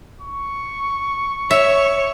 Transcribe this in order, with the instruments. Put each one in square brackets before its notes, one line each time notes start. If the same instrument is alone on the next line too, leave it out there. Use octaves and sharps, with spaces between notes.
[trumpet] C#6
[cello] C#5 [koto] E5